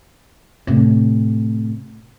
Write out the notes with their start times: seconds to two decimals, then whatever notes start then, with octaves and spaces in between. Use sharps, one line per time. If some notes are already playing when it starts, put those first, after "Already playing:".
0.67 A2 C3